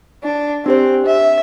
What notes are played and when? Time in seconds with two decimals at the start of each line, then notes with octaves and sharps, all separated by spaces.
0.24 D4
0.66 C4 D4 G4 C5
1.06 E5